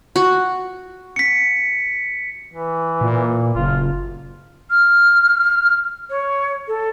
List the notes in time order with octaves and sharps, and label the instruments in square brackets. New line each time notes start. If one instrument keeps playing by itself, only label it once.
[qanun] F#4
[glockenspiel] B6 C#7
[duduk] E3
[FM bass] A#2
[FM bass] F#1 [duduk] F4
[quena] F6
C#5
A4